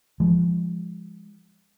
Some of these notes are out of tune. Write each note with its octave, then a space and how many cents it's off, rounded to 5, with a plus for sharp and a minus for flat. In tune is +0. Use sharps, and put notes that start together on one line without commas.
F3 -20 G#3 -25